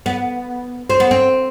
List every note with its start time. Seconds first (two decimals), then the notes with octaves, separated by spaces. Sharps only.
0.06 B3
0.90 C4
1.00 B3
1.11 C4